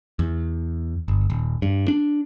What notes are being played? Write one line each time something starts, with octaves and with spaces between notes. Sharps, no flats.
E2
G1
D#1
G2
D4